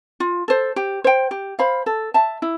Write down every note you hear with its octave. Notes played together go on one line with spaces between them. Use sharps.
F4
A4 C5
G4
C5 G5
G4
C5 F5 B5
A4
E5 A5
E4